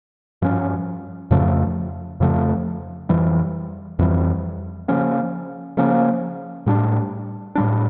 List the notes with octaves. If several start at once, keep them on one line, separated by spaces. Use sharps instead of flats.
G2 F3 C#4
F2 C#3 F3 A3
F2 C#3 F3 A3
F2 E3 G3
F2 E3 G3
C#3 F3 A#3 C#4
C#3 F3 A#3 C#4
A2 G3 D4
A2 G3 D4